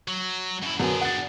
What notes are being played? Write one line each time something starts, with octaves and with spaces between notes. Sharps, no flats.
F#3
F#2 E4
F#2 B3 D4 G#4 G#5
F#5 A6